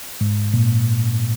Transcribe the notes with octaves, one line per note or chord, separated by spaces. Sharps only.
G#2
A#2